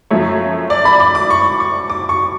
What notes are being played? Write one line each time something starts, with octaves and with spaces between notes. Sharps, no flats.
F#2 F3 A3 C#5
D5
B5
D6
D6
C#6
C#6
D6
C#6